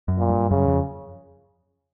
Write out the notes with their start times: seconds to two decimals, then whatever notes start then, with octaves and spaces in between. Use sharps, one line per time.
0.08 F#2
0.19 A#2
0.29 G2
0.50 F#2 C#3
0.67 F2